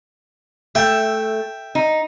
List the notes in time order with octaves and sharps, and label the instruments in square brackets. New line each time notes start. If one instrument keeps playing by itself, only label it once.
[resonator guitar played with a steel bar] A3 [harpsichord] E5 G5
[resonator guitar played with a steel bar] D#4